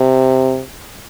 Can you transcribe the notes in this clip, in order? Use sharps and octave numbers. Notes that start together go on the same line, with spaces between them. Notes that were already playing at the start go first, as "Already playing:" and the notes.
Already playing: C3